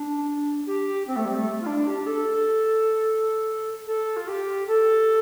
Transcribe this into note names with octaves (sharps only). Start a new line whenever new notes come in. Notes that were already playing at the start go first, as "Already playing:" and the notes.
Already playing: D4
G4
C4
A3
G3
A3
F4
D4
G4
A4
A4
F4
G4
A4